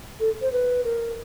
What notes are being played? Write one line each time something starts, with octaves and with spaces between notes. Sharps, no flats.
A4
C5
B4
A#4